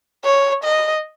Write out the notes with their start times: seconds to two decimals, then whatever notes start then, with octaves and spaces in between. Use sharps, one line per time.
0.24 C#5
0.64 D#5